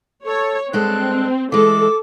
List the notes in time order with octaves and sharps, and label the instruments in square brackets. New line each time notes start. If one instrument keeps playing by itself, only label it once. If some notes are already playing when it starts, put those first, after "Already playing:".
[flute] A4 [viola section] C#5
[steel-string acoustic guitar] G2 G#3 A4 [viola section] C4 [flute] F#6
[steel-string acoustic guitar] E3 G#3 [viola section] A4 [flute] D6